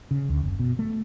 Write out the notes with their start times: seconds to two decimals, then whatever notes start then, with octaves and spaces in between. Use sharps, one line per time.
0.11 C#3
0.29 D2
0.43 F#1
0.60 B2
0.79 A3